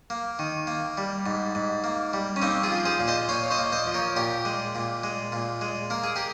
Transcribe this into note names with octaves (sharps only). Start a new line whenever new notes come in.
A#3
D#3
A#3
G3
G#2
G#2
A#3
G3
C#4
A#3 C4 D#4
F4 G#4
F3
G#4 C5
A#2
C5 D#5
A#2 C#5 F5
C#5
C5 D#5
A#3
C5 D#5
F3
A#4 C#5
A#2 G4 A#4
G#3
A#2
G#3
A#2
G#3
A#3 A#4
G#4
G4 A#4